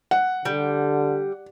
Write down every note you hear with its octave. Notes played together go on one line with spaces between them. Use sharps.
F#5
D3 G3